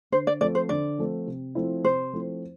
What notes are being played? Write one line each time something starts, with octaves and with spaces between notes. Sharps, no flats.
D3 C5
D5
F3 A3 C4 D5
C5
D3 D5
F3 A3 C4
C3
F3 A3 C4 E4
C3 C5
F3 A3 C4 E4